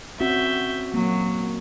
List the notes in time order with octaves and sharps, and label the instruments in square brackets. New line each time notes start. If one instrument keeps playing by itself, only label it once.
[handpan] C4 C#4 F#4 [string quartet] E5 G6
[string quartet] F#3 [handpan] A#3